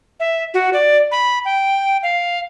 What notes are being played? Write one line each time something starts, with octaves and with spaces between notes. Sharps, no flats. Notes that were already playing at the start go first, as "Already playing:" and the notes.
E5
F#4
D5
B5
G5
F5